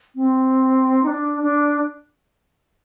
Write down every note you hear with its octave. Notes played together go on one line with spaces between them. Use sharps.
C4
D#4
D4
D4